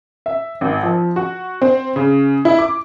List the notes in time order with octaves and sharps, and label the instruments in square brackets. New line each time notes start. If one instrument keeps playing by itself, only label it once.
[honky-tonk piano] E5
G#1
F3
F#4
C4
C#3
E4
D6